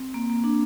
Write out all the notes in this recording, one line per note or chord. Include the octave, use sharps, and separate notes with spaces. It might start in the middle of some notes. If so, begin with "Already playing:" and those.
Already playing: C4
A#3
A#3
D4